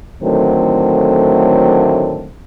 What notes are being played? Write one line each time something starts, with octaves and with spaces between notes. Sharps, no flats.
A2 D3 D#3 F#3 A3 C4